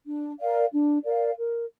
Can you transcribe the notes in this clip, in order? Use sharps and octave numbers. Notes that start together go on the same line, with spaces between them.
D4
A#4 D5 F5
D4
A#4 D5 F5
A#4